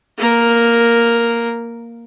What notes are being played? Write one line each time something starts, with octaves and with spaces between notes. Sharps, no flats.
A#3 A#4